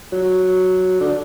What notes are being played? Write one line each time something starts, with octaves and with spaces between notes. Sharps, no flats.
F#3
D3